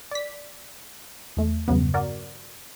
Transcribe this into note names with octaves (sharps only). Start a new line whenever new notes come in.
D5 B6
E2 A3
E2 G2 C#3 F#3 B3
F#4 A#4 D5